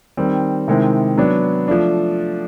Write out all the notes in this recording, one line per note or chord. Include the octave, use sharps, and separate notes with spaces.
D#3 G3 C4
C3 D#3 G#3 C4 E4
F#3 B3 D4
F3 A3 D4